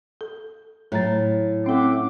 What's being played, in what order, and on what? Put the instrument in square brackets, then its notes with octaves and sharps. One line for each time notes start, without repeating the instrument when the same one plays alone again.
[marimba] A4
[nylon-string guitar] A2 [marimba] F#3 A#5 A6
[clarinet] C4 [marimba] C#4 A4 [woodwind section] E5 F#5 D6